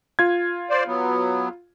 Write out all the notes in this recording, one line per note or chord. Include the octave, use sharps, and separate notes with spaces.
F4 G#6
C5 D5
F#3 B3